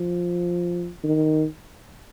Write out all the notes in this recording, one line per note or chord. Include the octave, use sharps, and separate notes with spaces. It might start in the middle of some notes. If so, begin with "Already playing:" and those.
Already playing: F3
D#3